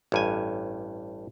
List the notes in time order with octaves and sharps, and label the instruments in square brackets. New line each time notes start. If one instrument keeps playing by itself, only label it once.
[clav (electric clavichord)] A1 G2 G#5